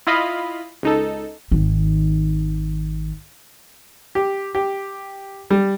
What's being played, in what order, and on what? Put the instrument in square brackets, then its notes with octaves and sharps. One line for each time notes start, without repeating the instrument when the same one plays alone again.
[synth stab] E4 F4 D#5 F5 B5
C#2 D#4 A4
[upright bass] G#1 D#3
[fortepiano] G4
G4
G3